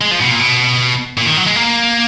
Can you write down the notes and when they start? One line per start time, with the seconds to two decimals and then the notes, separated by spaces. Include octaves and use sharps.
0.01 G#3
0.11 F3
0.21 B2
0.31 A#2
0.39 B2
1.17 A#2
1.26 D#3
1.37 F#3
1.46 G#3
1.56 A#3